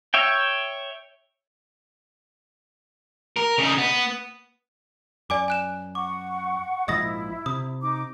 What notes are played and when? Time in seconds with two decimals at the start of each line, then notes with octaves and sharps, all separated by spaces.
0.14 C#5 E5 G5
3.36 A#4
3.58 C#3 D#4
3.78 B3
5.30 F#2 D5 G#5 D6
5.48 G#5 F#6 E7
5.95 F#5 C#6 D6
6.88 A#1 G#2 F3 E4 D#5 D#6 A#6
7.46 C3 D#6
7.81 D#4 D6